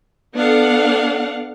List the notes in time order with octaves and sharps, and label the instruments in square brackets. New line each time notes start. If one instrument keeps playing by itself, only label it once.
[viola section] B3 D4 A4 F5 F#5